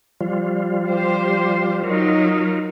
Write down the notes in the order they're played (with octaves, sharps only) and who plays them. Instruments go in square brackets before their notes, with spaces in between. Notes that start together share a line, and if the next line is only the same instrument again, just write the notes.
[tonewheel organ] F3 G3 F4
[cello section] G4 C5
[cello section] F#3 D#4 [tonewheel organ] F4 A#4